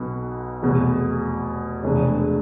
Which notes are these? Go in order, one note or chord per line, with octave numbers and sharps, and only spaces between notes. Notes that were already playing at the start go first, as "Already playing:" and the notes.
Already playing: B1 B2 B3
F1 E2 B2
F1 E2 B2 G#3 D4